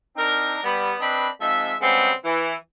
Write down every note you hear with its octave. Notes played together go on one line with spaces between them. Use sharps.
C4 D4 D#4 A#4
G3 B3
C4 D4 B4 D#5 B5
F3 G#3 C4 D#4 E5
C#3 G3 G#3 B3 C4
E3